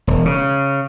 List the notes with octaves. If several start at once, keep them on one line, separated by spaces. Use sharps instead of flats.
E1
C#3